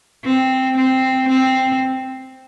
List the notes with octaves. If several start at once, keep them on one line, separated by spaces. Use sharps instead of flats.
C4
C4
C4